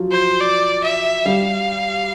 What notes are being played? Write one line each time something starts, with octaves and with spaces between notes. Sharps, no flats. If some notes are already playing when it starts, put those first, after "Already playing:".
Already playing: F3 F#3
C5
D5
E5
G3 F5